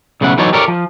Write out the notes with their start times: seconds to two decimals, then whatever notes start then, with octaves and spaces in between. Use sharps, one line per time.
0.21 B1 C#3 A3 E4 F#5
0.38 E3 F#3 D#4 A4 C#5 D5
0.53 G4 A4 A#4 C#5 D5
0.68 F3